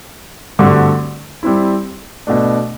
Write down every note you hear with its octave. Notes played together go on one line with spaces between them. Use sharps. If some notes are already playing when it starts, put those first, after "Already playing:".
G2 D3 A3 C4 F#4
G3 C4 E4
B2 A3 D4